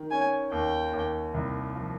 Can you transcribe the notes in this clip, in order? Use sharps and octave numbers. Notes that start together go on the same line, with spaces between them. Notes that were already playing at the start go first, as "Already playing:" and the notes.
Already playing: D#3
C#4 G#5
D#2 G5
D#2
C2
F3